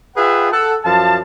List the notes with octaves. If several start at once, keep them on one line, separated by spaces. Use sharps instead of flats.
F4 G#4 B4 E5 F#5 G5
A4 F#5 A5
F#2 F3 F5 A5